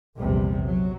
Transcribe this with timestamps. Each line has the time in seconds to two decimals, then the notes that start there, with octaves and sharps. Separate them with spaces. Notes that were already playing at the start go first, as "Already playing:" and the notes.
0.17 A#1 E2 C3 G3
0.65 F#3